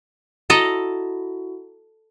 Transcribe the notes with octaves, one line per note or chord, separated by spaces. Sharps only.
E4 F#4 A4 D#5 A#5